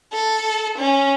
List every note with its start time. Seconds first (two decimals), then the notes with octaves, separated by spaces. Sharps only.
0.13 A4
0.77 C#4